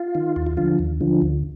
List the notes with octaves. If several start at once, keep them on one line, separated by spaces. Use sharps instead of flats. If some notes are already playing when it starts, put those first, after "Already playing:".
Already playing: F4
D#3
D#2 F4
F4
D3 F3 F4
D#2
D3 F3
D2